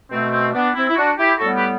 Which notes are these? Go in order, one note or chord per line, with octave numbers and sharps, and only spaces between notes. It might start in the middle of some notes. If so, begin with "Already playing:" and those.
B2 A3 C4
C4
B3 D4
C4 E4
E4
D4 F#4
E4 G4
A2 G3 B3 F#4 A4
G4 B4